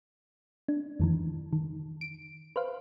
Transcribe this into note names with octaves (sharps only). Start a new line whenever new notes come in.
D4
F2 D#3 E3
D#3
D7
B4 C5 F5